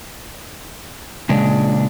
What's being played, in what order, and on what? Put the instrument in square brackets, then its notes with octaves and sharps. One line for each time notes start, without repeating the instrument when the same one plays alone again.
[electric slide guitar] A#2 C#3 G#3 D4